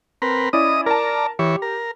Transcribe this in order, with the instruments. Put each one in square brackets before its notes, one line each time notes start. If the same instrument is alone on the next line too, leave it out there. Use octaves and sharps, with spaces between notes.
[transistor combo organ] C4 A#4 B4
[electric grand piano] C#4 E4 D5 [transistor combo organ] D#5 D#6
[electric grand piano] A#4 A5 [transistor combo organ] D5 A#5
[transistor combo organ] E3 C#5 [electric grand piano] G4
[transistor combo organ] A#4